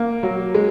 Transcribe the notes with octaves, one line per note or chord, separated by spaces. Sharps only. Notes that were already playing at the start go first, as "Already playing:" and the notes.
Already playing: A#3
F#3
G#3